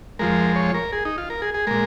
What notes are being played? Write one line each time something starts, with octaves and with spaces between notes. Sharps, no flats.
F2 F3 G#3 A#4
C#5
A#4
G#4
D#4
F4
A#4
G#4
G#4
A#2 G#3 A#4